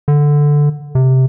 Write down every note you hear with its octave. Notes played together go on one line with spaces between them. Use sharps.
D3
C3